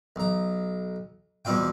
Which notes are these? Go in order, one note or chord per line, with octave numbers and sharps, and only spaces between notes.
B1 A#5
E2 B2 G3 C4 F4 G5